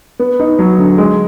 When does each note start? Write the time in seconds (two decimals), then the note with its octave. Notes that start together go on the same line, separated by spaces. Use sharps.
0.19 B3
0.40 D#4
0.59 F#3
0.78 D3
0.98 G#3